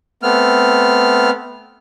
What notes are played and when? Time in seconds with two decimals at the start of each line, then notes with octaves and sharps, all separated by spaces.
0.23 A3 B3 C4 F6